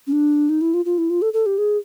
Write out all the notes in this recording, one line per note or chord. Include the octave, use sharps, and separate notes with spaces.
C#4
D4
D#4
E4
F4
F4
E4
F4
A4
A4
G4
G#4